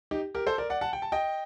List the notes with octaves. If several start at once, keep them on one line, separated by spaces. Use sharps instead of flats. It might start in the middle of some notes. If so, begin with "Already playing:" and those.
D#4 G4
G4 A#4
A4 C5
A#4 D5
D5 F#5
F#5 A5
G5
A5
D#5 G5